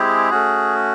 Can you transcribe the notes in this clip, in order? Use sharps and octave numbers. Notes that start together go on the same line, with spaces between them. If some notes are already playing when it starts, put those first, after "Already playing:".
Already playing: G#3 C4 E4 G4 G#4
A3 C#4 F#4